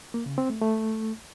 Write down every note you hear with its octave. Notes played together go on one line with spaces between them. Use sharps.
A#3
C#3
C4
A3
A3